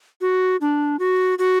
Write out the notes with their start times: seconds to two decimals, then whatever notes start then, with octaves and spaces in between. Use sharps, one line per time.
0.21 F#4
0.61 D4
0.99 F#4
1.39 F#4